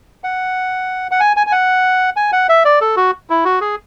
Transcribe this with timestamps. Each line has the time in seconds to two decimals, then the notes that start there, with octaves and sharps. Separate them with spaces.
0.24 F#5
1.11 F#5
1.20 G#5
1.37 G#5
1.47 G#5
1.52 F#5
2.16 G#5
2.32 F#5
2.49 E5
2.65 D5
2.81 A4
2.97 F#4
3.30 E4
3.45 F#4
3.61 G#4